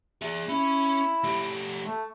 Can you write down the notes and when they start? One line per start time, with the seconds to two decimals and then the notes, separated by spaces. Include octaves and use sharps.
0.22 G#4 E5
0.49 C#4 E4
1.24 A3 G4
1.86 A3